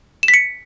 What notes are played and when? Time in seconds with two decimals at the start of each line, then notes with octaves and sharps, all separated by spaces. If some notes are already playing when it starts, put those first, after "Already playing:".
0.23 E7
0.28 B6
0.34 C#7